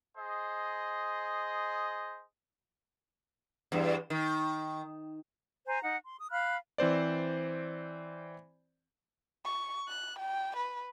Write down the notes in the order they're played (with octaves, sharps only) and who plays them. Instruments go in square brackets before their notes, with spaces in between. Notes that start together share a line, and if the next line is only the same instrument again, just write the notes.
[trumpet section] G#4 C5 D#5
[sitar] E2 G2
D#3
[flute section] C5 G#5 A#5
D#4 F#5
C6
D#6
F5 B5 F6 F#6
[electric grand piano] E3 C4 C5 D5
[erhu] C#6
F#6
G5
B4